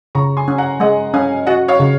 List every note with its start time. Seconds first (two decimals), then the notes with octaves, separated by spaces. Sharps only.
0.15 C#3 A#5 C#6
0.37 G#5 C6
0.48 C#4
0.58 F#5 A#5
0.80 G#3 D#5 F#5
1.14 C#4 F5 G#5
1.47 F#4 D#5 F#5
1.68 C#5 F5
1.80 C#3